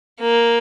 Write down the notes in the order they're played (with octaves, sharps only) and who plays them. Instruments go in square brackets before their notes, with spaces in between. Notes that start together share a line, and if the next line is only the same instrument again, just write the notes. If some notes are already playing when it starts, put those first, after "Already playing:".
[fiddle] A#3